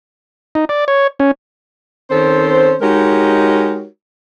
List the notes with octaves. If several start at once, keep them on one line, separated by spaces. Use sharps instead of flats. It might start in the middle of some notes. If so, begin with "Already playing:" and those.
D#4
D5
C#5
C#4
D#3 C4 C#4 A4 C5
G#3 D#4 F#4 G4 A#4 C#5